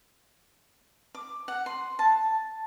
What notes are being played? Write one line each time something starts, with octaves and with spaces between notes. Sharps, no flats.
D6
F#5
C6
A5